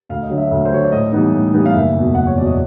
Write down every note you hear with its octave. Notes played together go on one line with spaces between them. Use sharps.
D2 F5
D#5
D3 F#3
E5
D2 E5
C5
D3 F#3 C#5
D5
A2 D#5
E3 G3 B3 D#4
A2
E3 G3 B3 D#4
F5
F#1 E5
E2 B2
F#1 F#5
C#5
E2 B2 D5
D#5